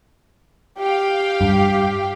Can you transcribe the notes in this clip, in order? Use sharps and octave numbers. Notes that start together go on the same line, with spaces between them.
G4 F5 G5
G2